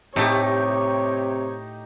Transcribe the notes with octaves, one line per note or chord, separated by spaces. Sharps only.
A2 C3 A3 D#4 G4 C#5